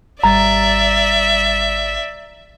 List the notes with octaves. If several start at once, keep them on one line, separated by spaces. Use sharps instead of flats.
G#1 G3 D5 E5 A#5 A6